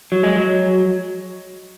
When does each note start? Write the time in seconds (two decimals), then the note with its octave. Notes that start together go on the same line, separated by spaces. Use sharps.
0.12 F#3
0.23 G#3
0.36 F#3